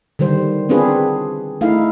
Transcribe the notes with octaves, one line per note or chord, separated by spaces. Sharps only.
D3 D#3 G3 C5
B3 C4 D4 F4 G#4 B4
A3 D#4 E4 F5